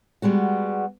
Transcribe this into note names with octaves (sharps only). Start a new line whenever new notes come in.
G3 G#3 B3 F#4